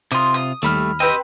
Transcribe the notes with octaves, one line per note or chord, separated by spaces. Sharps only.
C3 F4 C6 D#6
D#6
D#2 G3 A3 B5 F6
C4 G4 B4 D#5